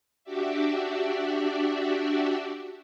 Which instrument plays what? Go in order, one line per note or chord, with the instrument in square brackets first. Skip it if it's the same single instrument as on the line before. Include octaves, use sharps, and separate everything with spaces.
[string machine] D4 F#4 G4 D5 E5